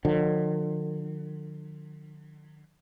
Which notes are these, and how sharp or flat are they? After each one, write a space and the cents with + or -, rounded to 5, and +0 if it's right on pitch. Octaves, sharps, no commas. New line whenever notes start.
D3 +45 F3 +45